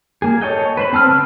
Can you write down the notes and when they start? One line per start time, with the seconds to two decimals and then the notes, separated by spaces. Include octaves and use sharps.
0.22 A#3 G#4
0.41 A4 C#5 D#5 G5
0.77 B4 C5 B5
0.93 C4 A5 E6 F6
1.06 C#3 G5 C#6